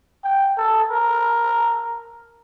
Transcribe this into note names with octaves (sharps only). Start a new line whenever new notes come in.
G5
A4
A#4